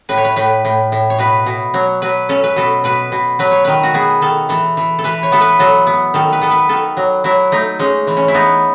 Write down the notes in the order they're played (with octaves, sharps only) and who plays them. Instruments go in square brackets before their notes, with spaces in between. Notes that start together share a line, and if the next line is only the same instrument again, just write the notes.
[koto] A2 B4
C#5
B4
A2 B4
A2
A2
C#5
B2 B4
B2
F#3 C#5
F#3 B4
C#4 A4
B4
B2 A4
B2 B4
B2
F#3 B4
C#5
D#3 B4
F#4
B3 G#4
D#3 A4
E3 A4
E3
A4
E3 B4
C#5
B3 A4
B4
F#3 A4
B3
D#3 A4
B4
B3 A4
B4
D#3 A4
F#3
F#3 E4
A3 D#4
G#3 C#4
E3
C#4
E4
B3 D#4